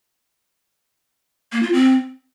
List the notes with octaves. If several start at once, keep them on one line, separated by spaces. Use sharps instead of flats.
A#3
F4
C4